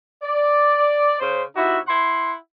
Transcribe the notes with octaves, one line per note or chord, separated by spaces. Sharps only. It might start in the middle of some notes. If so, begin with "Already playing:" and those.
D5
C#3 C5
C3 D#4 E4 F#4 E5
E4 F#5 C6